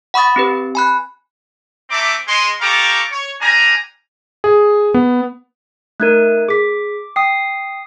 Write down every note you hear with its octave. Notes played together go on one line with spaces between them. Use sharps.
F#5 B5 C#6 D#6 A6
C4 G4 B4
G#5 B5 F#6
A3 C4 E5 A#5 D6
G#3 C6
G4 A4 F5 A#5 C#6 D6
C#5
G3 D4 G#5 A#5
G#4
B3
A3 D#4 A#4 F#6 G#6 D#7
G#4 D6 B6
G5 D#6 C7